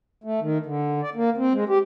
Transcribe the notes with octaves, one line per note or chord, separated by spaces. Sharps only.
A3
D#3
D3
D5
A#3
C4
G#3
G4